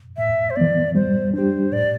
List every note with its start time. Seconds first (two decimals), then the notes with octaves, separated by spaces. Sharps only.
0.17 A2 E5
0.50 C5
0.56 E3 B3 D5
0.95 G3 C5
1.34 D4 G4 C5
1.72 A2 D5